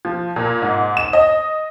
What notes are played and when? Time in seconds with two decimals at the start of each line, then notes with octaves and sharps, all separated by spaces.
0.05 F3
0.36 A#2
0.62 G#2
0.97 E7
1.13 D#5